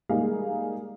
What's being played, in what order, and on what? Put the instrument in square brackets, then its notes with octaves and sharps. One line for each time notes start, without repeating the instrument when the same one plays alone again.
[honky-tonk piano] G3 G#3 A#3 D#4 G#4 F5